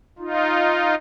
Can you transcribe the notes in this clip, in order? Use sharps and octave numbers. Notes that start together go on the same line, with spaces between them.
D#4 F4